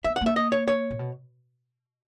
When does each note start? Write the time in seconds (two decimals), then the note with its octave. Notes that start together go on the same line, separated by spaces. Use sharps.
0.04 B3 E5
0.16 F#5
0.21 A#3 E5
0.36 D#5
0.52 C#5
0.68 C#5
0.91 A#2
0.99 B2